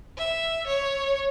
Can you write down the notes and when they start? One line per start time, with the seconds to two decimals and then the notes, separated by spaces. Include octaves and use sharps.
0.18 E5
0.67 C#5